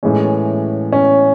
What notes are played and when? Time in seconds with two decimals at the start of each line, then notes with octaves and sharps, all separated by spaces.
0.03 A2 E3 G#3 C#4
0.92 C#4